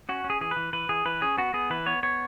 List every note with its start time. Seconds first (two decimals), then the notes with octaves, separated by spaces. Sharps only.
0.09 C#4 F#4
0.24 C#4
0.30 G#4
0.41 E3 G#4
0.51 B4
0.57 E3
0.73 E3 B4
0.89 E3 G#4
1.05 E3 B4
1.21 C#4 G#4
1.37 B3 F#4
1.53 B3 G#4
1.70 E3 B4
1.86 B3 C#5
2.03 B3 C#5